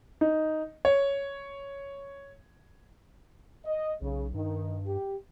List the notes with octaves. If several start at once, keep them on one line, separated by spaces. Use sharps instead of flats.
D#4
C#5
D#5
B1 C#3
G2 D#3
G4